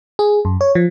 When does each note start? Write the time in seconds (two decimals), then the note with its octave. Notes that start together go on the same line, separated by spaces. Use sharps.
0.19 G#4
0.45 F#2
0.61 C#5
0.75 F3